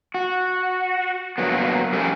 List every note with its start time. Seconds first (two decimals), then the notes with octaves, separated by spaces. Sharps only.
0.14 F#4
1.38 G2 F#3 A#3 B3
1.93 F3 A3 C#4 D#4 G4 A#4